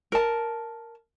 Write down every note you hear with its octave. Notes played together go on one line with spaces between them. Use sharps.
A#4 A5